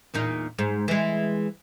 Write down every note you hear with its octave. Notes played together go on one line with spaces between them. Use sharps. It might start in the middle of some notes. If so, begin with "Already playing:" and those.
E2 A#2 D#4
G#2
E3 G#3